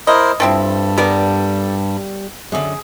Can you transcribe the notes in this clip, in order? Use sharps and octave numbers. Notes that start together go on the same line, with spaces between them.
E4 A#4 C5 D#5
G2 F3 C4 E4 A4
G3 B3 A#4 D5
F#2 D3 G#4